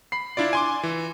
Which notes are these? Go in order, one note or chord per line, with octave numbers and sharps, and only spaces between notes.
B5 C7
D4 E4 F4 D5
G#5 C6 D6
E3